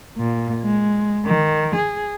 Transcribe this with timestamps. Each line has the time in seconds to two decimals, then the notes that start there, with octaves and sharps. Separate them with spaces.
0.18 A#2
0.63 G#3
1.25 D#3
1.75 G#4